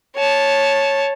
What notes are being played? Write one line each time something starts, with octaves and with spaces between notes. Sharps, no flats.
C#5 A5